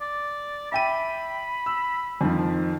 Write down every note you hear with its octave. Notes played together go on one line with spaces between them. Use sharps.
D5
E5 G5 B5 D#7
E6
F2 D#3 F3